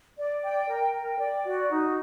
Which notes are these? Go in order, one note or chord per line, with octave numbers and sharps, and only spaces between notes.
D5
G5
A#4
G5
D5
F#4
D#4